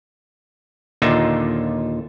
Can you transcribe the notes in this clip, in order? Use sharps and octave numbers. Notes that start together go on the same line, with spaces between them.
D#2 A#2 D3 D#4 F4 E5